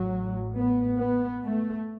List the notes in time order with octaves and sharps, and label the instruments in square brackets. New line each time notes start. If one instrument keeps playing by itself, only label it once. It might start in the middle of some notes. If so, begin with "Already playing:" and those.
Already playing: [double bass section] A1 A2 F#3
B3
B3
A3